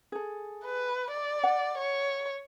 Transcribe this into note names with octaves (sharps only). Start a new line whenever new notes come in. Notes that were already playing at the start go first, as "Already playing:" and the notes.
G#4 A4
B4
D5
F#5
C#5